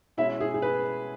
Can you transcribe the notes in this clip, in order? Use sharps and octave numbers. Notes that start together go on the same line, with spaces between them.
B2 G#3 C#4 E4 E5
G#4
G#4
B4